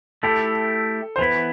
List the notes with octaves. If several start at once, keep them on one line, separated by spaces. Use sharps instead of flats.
A3 E4 G4 A4
C5
E3 B3 E4 B4